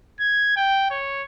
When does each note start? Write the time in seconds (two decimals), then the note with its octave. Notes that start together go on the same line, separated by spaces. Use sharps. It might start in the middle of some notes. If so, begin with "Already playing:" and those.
0.20 G#6
0.56 G5
0.91 C#5